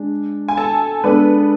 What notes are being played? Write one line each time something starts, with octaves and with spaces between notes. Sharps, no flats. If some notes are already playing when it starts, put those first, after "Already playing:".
Already playing: G#3 D4
G#5
A4 A5
G#3 B3 D4 A4 B4